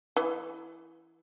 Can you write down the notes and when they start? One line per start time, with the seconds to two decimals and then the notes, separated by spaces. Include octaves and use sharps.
0.16 E3